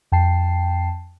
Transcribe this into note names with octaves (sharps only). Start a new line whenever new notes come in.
F2 G5 A5 C7